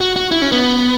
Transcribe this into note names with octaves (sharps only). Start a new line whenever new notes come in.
F#4
F#4
E4
C#4
B3